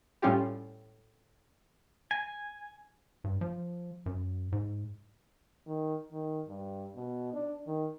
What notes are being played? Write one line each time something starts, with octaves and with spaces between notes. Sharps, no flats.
A2 G3 C#4 F4 G4
G#5
G2
F3
F#2
G#2
D#3
D#3
G2
B2
D4
D#3